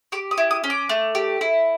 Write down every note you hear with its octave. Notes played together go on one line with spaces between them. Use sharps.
G4 D6
D#6
E4
D#6
C#4
D6
A3
G4
E4